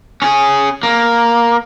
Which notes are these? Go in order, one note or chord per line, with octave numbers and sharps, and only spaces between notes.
C#4 G#4
A#3